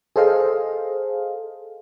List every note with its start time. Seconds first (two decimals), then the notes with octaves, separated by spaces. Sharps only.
0.16 G#4 A4 C5 D#5 F5